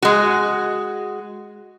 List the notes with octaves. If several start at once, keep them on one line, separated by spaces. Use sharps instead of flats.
G#3 F#4